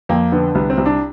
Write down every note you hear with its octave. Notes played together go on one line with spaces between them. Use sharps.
F2 A#3
D3 B3
C2 B3
C4
C2
D4